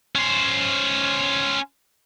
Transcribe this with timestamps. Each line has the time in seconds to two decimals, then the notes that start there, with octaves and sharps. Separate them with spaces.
0.15 C#4 C5